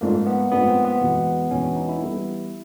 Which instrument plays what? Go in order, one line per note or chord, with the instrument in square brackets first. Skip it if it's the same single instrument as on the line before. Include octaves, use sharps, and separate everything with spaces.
[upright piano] G#2 F3 A3 D4 F4 [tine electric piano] A#3
[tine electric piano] B3
[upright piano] G#2 F3 A3 D4 F4 [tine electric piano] B3
[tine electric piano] C4
B3
[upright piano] E2 B2 G#3
[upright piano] E2 B2 G#3 [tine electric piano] C#4
[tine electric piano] D4
D#4
E4
[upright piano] E3 G3 B3